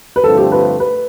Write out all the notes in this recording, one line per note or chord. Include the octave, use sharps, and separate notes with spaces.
B4
G2 D3 F3 A3 C4 A4
G4
B4
B4